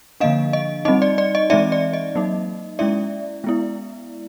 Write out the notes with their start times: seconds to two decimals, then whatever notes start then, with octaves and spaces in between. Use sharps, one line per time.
0.20 D3 F3 A#3 D4 D#5 F5
0.53 D#5
0.85 G3 C4 D#4 D#5
1.02 D5
1.18 D5
1.35 D#5
1.50 E3 G#3 C4 D#4 D5 E5
1.72 D5
1.93 D#5
2.15 F#3 A#3 D#4
2.79 G#3 C#4 E4 D5 E5
3.44 G#3 B3 E4